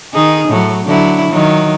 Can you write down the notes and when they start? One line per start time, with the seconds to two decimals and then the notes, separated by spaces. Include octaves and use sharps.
0.13 D#3 D#4 G#4
0.48 A2 F#3
0.85 D3 F#3 E4
1.31 D#3 F#3